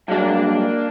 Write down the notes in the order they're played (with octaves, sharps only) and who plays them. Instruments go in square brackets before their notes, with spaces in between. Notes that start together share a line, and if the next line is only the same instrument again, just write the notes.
[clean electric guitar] G2 F#3 G#3 [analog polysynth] A#3 D4